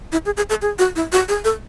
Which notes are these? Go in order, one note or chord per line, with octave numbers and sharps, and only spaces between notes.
E4
G#4
G#4
A4
G#4
F#4
E4
F#4
G#4
A4